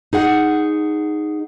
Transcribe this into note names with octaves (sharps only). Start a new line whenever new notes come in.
D#4 G#4 F#5